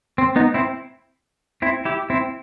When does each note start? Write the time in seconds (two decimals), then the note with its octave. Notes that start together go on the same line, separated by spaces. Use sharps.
0.18 C4
0.36 B3 D#4
0.54 C4 E4
1.62 C4 E4
1.85 E4 G4
2.10 C4 E4